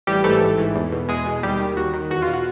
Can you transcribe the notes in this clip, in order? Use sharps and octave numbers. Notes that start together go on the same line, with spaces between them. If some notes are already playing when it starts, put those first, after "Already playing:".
A1 G3 G4
G#2 E3 A3 A4
A1
G#2 E3
E2
B2
E2 G#3 G#4
B2
D#2 G3 G4
D#3
D#2 F#4
D#3
E2 F#4
F4
B2
F#4